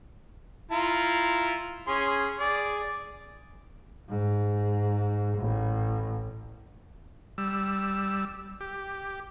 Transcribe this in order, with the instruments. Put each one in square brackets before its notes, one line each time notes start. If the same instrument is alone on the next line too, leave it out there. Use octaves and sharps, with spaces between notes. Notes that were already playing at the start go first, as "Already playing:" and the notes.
[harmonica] E4 F4 A#5
C#4 G#4 C6
G#4 D5
[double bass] G#2
A1
[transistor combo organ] G3 E6
G4